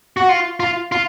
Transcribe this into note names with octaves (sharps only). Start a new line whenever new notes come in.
F#4
F4
F4
F4